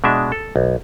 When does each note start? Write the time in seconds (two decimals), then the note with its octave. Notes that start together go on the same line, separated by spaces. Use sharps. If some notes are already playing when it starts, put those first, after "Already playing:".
0.04 B2 G#3 D4 E5
0.32 A4
0.56 B1